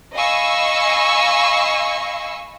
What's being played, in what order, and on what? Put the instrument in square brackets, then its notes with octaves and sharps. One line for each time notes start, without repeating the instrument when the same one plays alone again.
[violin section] D#5 F5 G#5 B5 C#6 E6